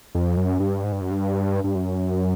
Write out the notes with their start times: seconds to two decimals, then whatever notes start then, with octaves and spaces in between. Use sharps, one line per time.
0.15 F2
0.37 F#2
0.60 G2
0.84 G#2
0.92 G2
1.01 F#2
1.11 G2
1.64 G2
1.75 F#2